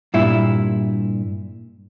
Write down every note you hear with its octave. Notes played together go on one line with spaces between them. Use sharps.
G2 A#2 E4